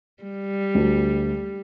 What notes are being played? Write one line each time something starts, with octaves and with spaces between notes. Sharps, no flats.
G3
D2